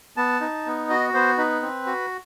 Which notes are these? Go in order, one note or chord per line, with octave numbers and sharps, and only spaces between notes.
B3 A5
D#4
B3
F#4 D#5
B3 C5
D#4 B4
C4
F#4